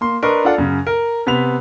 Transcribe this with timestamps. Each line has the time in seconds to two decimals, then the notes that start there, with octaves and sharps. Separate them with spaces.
0.01 A#3 C6
0.22 D4 A#4 B4 D#5 C6 C#6
0.45 D4 F4 A4 D5 F#5
0.58 F#2 C#3
0.87 A#4
1.26 C3 B3 B5 F7